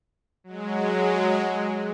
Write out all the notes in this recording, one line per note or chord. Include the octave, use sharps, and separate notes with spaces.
F#3 G#3